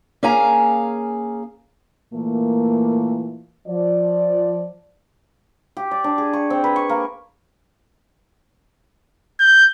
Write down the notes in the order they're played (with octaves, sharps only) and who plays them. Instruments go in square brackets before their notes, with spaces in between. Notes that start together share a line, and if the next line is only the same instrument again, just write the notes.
[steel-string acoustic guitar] A#3 C#4 G#4 F5 G#5 A#5
[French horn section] A#2 E3 A3 A#3
F3 D5
[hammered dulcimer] G4
D5
D4
G#4
C#6
C4
B4
C#6
A#3
[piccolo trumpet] G6